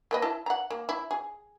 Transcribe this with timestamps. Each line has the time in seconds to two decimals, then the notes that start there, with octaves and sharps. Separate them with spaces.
0.11 A#3 B4 D#5
0.22 E4 A5
0.46 F#5 A#5
0.71 A#3
0.89 E4
1.11 G#4